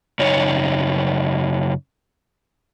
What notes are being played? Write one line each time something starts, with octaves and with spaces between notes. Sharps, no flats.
F#2 C#3 D#4 C#5